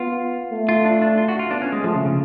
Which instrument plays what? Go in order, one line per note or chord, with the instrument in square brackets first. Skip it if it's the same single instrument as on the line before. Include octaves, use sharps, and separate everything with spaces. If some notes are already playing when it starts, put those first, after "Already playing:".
Already playing: [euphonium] B3 [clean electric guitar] F4
[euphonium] A3
[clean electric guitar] F4
D4
D4
F4
F#4
F4
[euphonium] B3 [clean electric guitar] D4
[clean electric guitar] C#4
G#3
[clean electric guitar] F3 [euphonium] A3
[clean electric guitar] C#3
C#3